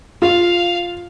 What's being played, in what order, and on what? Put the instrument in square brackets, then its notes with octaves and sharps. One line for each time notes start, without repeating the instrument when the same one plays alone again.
[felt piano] F4 [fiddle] F5